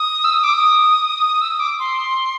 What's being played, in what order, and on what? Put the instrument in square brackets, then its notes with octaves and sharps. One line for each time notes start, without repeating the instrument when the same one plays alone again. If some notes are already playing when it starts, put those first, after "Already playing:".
Already playing: [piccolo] D#6
E6
D#6
D6
D#6
E6
D#6
D6
C6